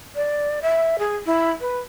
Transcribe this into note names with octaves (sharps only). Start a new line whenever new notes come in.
D5
E5
G#4
E4
B4